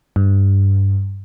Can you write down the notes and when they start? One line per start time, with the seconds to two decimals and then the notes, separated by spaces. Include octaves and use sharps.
0.16 G2